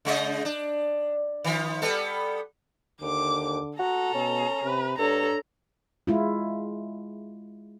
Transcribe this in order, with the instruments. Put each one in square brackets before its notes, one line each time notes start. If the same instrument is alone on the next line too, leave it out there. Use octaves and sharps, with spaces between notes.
[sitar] C#3 G#3 D#5
D4
D#3 F3
G3 B3 A4
[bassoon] D#2 [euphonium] D3 [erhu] D6
[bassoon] F#4 [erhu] A4 [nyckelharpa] A#5
[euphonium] B2 [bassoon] C#4
[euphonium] C3 [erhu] B4
[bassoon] G2 [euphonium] D4 [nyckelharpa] A4 C#5 [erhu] A#5
[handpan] G#3 E4 F4